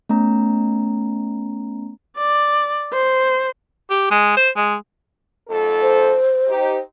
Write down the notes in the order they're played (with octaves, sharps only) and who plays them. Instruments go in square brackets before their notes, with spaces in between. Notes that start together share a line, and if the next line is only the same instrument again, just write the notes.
[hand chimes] A3 B3 C#4 A#5
[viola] D5
C5
[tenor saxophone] G4
G#3
C5
G#3
[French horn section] F2 G#2 A4
[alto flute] C5
[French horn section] D#4 G4